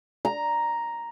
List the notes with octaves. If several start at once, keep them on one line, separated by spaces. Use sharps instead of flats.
A#5